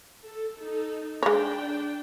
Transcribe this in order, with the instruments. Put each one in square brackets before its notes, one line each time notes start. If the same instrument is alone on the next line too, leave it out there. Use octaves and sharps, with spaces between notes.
[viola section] A4
D#4 A4
[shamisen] G#3 C#5 [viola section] D4 G5